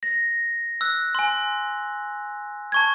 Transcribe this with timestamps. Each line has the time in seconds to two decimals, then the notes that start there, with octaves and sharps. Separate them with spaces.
0.03 A#6
0.81 E6 F#6
1.15 G#5 C6
2.72 A5 C#6 G#6